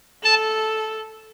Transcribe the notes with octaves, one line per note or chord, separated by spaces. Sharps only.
A4 A5